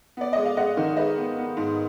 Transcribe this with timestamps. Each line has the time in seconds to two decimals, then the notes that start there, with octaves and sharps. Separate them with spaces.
0.17 B3 D5
0.33 G#3 D#5
0.45 F5
0.57 G#3 D#5 F#5
0.77 D#3
0.97 G#3 B4 D#5
1.17 B3
1.37 B3
1.57 G#2